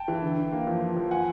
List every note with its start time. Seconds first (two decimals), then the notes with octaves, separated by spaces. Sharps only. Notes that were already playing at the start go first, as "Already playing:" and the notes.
Already playing: G5 A5
0.08 E3
0.22 D3
0.38 D3
0.52 A#3
0.67 F3
0.81 F3
0.97 F3
1.11 F#5 G#5